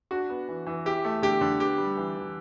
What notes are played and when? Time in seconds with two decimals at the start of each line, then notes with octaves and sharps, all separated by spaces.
0.11 D4 F#4
0.30 B3
0.49 E3
0.67 E3
0.86 E4 G4
1.05 A3
1.22 D3 G4
1.41 D3
1.60 B3 G4
1.78 G3
1.97 E3
2.15 E3